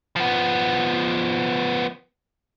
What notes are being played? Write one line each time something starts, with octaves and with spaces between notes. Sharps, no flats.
F3 B3